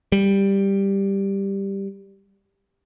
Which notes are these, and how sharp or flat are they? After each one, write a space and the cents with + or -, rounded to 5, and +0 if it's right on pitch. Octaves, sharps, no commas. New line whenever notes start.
G3 +5